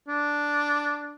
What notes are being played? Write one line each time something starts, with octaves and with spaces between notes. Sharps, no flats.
D4